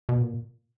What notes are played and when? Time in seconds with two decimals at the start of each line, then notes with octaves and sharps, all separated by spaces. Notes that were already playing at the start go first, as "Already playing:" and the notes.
0.09 B2
0.21 A#2